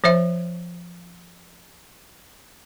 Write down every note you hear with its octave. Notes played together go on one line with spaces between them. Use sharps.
F3 C5 E5